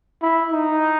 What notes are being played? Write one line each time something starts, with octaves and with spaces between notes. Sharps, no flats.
E4
D#4